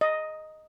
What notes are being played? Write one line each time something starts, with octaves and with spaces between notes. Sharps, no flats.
D#5